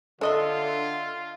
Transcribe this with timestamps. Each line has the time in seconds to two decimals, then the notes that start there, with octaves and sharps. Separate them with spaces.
0.21 D3 D4 F4 A4 D#5 E5